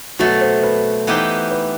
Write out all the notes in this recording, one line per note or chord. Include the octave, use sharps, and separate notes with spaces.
B2 F#3 A3 F#4
C5
B4
E3 B3 D#4 G4 C5
B4